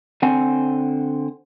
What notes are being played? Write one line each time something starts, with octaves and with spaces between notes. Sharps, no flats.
D3 C4 C5 F#5 G#5